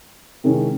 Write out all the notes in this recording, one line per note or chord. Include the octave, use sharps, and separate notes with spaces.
C3 D#3 G#3 C#4 E4